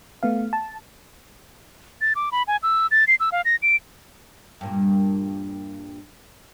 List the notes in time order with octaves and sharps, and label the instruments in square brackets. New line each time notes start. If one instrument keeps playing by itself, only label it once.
[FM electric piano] A3 B3 F5
A5
[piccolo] A6
D6
B5
G#5
E6
A6
C7
E6
F5
A#6
D7
[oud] G2 A#2